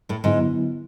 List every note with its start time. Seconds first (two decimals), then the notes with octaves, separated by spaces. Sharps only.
0.09 A2 A3
0.24 G#2 D3 F#3 G#3 B3 E4